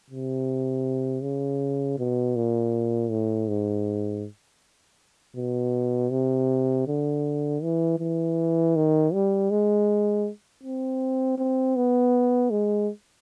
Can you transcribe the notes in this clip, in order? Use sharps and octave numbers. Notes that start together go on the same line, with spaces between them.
C3
C#3
B2
A#2
A2
G#2
B2
C3
D3
E3
E3
D#3
G3
G#3
C4
C4
B3
G#3